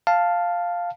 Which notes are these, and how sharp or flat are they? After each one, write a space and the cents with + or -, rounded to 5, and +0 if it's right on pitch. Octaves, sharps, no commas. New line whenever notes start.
F5 +0 A5 +0